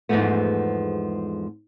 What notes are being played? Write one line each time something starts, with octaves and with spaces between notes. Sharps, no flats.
E2 G#2 F3 G#3 A3 B3